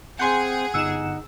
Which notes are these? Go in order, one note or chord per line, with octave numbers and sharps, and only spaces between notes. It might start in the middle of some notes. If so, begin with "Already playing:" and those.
C4 G#4 F#5 G#5 C6 G6
G1 D#4 F#5 E6 E7